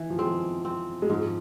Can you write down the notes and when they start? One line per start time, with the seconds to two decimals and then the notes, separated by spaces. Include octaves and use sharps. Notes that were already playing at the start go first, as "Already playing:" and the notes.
Already playing: E3
0.10 F3
0.19 G#3 C4
0.65 C4
1.02 G#3
1.10 G#2 F3